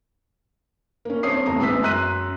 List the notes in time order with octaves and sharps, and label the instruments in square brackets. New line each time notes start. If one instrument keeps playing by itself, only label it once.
[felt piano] A#3 C#4
G2 C4 C#5 D#6 C7
E2 A3 A#5 D#6
A1 G#3 B3 E6 B6
F#2 A#5 C6 F#6 B6 D#7